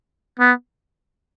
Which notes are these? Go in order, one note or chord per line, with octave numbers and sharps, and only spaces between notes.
B3